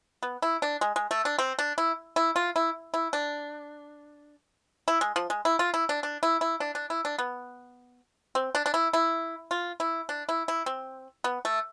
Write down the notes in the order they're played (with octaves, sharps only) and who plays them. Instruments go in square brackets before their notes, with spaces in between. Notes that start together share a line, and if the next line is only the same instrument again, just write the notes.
[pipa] B3
E4
D4
G#3
G#3
A3
D4
C4
D4
E4
E4
F4
E4
E4
D4
E4
G#3
F3
G#3
E4
F4
E4
D4
D4
E4
E4
D4
D4
E4
D4
B3
C4
D4
D4
E4
E4
F4
E4
D4
E4
E4
C4
B3
A3